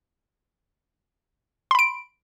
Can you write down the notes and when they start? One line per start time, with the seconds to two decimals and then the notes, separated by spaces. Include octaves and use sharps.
1.71 C6
1.75 B5
1.79 D7